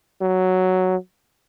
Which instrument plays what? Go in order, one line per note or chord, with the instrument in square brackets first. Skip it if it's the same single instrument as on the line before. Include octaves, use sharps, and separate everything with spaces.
[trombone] F#3